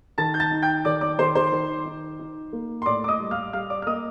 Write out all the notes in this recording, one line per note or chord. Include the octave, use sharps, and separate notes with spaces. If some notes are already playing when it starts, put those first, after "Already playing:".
D#3 A5 A6
G6
A5 A6
D#4
G5 G6
D#3 D5 D6
D5 D6
D#3 C5 C6
C5 C6
D#3
D#4
D#4
A#3
C6
A2 D5 D6
D6
D#5 D#6
G3
F5 F6
G3 F5 F6
D5 D6
F6
A#3 D#5 D#6